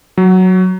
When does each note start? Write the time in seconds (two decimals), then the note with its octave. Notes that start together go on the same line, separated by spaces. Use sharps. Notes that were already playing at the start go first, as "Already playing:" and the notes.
0.18 F#3